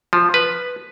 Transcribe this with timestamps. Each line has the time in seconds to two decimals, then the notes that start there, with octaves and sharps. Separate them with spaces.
0.13 F3
0.34 B4